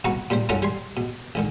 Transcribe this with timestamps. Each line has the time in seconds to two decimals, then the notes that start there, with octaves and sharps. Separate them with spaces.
0.04 C2 B2 F#4 B4 A#5 C#6
0.30 A#2 G3 D4 C5
0.49 G2 C#4 D#4 F4 A4 F#5
0.62 G3 G#5 C6
0.97 B2
1.35 C#2 D3 D#3